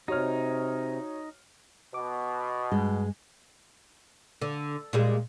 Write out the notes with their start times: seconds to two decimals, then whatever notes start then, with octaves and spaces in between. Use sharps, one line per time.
0.08 C3 D#4 F#4 C#5 F6
1.94 B2 D6
2.72 G2 G#3
4.41 D3
4.93 A#2 G3 G#3